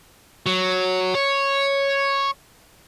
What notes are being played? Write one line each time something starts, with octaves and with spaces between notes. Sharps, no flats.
F#3
C#5